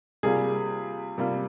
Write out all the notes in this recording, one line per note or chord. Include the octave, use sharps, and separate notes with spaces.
C3 G3 A#3 F4 G#4
C3 G3 A#3 F4